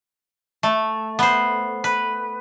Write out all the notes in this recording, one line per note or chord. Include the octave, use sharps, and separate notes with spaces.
A3
B3 C5
B4